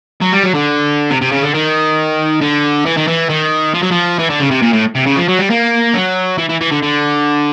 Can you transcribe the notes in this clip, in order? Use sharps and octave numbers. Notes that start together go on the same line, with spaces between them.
F#3
G3
F#3
D3
C3
C3
C#3
D3
D#3
D3
E3
D#3
E3
D#3
F3
F#3
F3
E3
D3
C#3
C3
A#2
A2
C3
C#3
F3
F#3
G3
A#3
F#3
E3
E3
E3
D3
D3